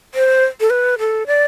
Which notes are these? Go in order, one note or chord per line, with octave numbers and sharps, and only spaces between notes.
C5
A4
B4
A4
D5